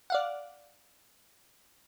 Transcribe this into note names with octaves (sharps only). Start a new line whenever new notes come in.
D5 F5 F#5